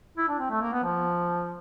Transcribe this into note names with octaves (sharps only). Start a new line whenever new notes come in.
E4
D4
C4
A3
A#3
B3
F3